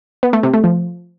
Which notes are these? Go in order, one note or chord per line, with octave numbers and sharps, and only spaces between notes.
B3
A3
C3
A3
F3